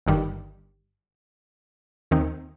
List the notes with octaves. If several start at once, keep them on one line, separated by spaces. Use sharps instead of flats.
G1 G2 D#3 G3
D#2 D#3 C4 D#4